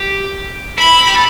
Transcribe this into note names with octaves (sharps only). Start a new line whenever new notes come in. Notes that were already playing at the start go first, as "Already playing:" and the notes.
Already playing: G4
E4 B5
G4
A4